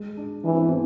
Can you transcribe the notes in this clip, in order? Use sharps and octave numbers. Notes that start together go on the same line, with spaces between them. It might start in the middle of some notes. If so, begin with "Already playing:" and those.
Already playing: G#3
D4
E3 D4
C4
B3
C4